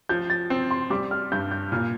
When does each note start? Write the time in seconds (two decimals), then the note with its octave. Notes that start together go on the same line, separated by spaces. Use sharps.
0.09 F3 G6
0.30 A6
0.50 C4
0.71 C6
0.90 G3 D6
1.11 F6
1.32 G2 G6
1.51 G6
1.72 A#2 F6